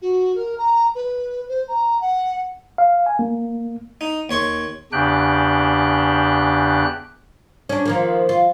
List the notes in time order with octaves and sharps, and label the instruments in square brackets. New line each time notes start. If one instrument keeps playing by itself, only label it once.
[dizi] F#4
A#4
A#5
B4
C5
A#5
F#5
[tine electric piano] F5
G#5
A#3
[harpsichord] D#4
D#2 C#5 C6 C#6
[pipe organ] E2 C#3 D4 G4 G5 F#6
[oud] C#4 D4
D#3 F3 A#3
F4